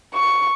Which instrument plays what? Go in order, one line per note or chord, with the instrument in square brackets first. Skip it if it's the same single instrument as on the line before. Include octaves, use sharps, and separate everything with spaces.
[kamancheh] C#6